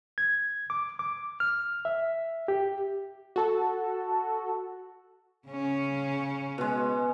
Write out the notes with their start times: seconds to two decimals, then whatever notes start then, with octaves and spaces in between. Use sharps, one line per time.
0.18 G#6
0.70 D6
0.99 D6
1.40 F6
1.85 E5
2.48 G4
3.36 F#4 A4
5.48 C#3 C#4
6.58 B2 G#3